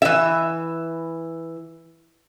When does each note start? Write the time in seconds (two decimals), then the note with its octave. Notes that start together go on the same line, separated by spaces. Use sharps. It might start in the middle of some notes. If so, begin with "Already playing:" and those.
0.02 E3 E5